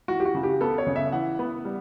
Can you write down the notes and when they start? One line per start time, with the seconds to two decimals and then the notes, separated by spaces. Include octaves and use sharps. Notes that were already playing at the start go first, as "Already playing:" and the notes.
0.08 E3 F#4
0.20 G4
0.25 F#4
0.35 C#3
0.43 G4
0.61 B3 A4
0.78 C#5
0.87 C#3
0.96 E5
1.12 E3 F#5
1.39 B3
1.65 G3